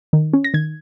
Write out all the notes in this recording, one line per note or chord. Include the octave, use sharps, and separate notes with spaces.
D#3
C#4
A#6
D#3 G#6